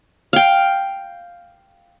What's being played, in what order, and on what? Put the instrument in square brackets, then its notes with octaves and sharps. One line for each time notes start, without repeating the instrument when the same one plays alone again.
[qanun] F5 G5